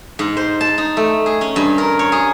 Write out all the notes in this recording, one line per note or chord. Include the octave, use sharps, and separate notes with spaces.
G#2
C5
A5
D#4
A3
G#4
C#4
G2
A#4
C#5
G#4